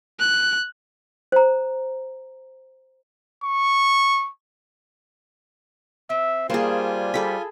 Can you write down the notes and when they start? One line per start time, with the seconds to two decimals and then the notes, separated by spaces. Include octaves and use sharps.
0.19 F#6
1.32 C5 A#5
3.44 C#6
6.10 C4 E5
6.50 G3 A#3 D4 F4 G#4 C5 G#5
7.14 G3 G#4 A4 B5